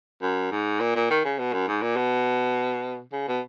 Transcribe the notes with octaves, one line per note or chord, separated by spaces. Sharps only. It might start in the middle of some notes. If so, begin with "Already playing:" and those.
F#2
G#2
A#2
A#2
D#3
C#3
B2
F#2
G#2
A#2
B2
C#3
B2